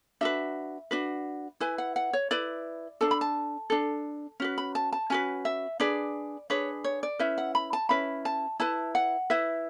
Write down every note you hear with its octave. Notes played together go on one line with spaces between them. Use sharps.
D4 F#4 B4 E5
D4 F#4 B4
E4 B4 G#5
F#5
F#5
C#5
E4 B4 D5
D4 A4 A5
B5
A5
D4 A4
C#4 F#4 B4
B5
A5
A5
C#4 F#4 B4 G#5
E5
D4 G#4 B4 D5
D4 G#4 B4 C#5
C#5
D5
C#4 E4 B4 E5
F#5
B5
A5
C#4 E4 B4 B5
A5
E4 B4 A5
F#5
E4 B4 E5